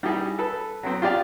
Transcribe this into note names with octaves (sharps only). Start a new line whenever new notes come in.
G3 D#4 E4 G4 G#4
A4 B4
F#3 B3 C4
F4 G4 G#4 D5 F5